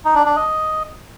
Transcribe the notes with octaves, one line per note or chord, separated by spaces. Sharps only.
D#4
D4
D4
D#5